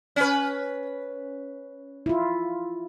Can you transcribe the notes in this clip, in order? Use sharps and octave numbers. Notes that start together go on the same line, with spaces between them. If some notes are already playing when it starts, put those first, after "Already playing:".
C#4 B4
E4 F4